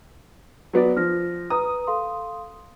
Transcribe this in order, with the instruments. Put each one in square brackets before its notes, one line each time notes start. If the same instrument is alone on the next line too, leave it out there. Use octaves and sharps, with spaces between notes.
[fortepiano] F#3 B3 D5
[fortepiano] F3 [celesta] F6 A#6
[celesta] B4 A#5 [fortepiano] D#6
[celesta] A4 F5 C6